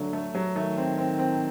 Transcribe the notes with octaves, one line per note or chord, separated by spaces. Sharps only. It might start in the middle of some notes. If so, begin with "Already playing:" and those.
Already playing: D3 F#3 A3
A3
F#3
D#3 A3
C4
C4
C4